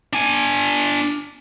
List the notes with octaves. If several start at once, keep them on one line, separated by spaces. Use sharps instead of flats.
D4 G#5